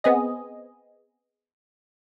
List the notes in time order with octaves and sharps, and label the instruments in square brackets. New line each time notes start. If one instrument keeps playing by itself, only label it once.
[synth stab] B3 C4 G#4 D#5